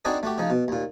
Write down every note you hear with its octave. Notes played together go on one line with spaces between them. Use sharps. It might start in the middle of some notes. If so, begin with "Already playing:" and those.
C4 D4 D#4 F#4 G#4 A4
A3 F#4 G4
C#3 F3 D#4
B2
D#2 A#2